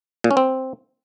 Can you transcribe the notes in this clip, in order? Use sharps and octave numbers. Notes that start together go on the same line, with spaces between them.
A#2
C#4
C4